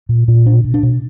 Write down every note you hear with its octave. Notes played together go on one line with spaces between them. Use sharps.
A#2
A#2
B2 D4
B2
D4
B2